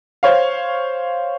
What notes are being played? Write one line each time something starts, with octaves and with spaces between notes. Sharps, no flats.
C5 C#5 F5